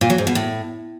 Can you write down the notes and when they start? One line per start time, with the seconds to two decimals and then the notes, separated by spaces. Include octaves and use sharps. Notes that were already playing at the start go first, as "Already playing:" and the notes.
0.01 A#2
0.10 F#3
0.18 G#2
0.27 B2
0.35 A2